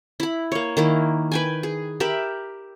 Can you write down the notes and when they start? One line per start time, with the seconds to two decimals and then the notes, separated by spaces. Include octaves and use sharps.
0.20 E4 B5
0.52 A#3 C#5
0.77 D#3 A#3 E4
1.32 B4 G5 G#5
1.63 G#4
2.00 G4 A#4 E5 B5